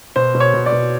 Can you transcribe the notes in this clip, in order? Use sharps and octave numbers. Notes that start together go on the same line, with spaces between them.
B2 C5
B2
C#5
B2
D5
B2